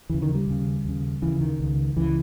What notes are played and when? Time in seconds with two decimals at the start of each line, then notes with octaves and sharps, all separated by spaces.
0.10 D#2 C#3 E3
0.22 D#3
0.35 G3
0.47 D#2 C#3
0.84 D#2 C#3
1.22 D#2 C#3 E3
1.41 D#3
1.60 C#2 C#3
1.96 C#2 C#3 E3